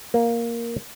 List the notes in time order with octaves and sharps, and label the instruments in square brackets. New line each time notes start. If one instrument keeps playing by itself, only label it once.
[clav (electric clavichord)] A#3